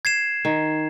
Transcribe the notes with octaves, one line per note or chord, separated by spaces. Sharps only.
G#6 C7 E7
D#3